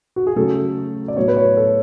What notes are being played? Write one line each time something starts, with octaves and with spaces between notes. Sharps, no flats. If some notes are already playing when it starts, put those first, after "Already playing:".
F#4
G#4
C#3 F#3 A3 A4
D5
A2 F#3 B3 C#5
B4
C#5
A4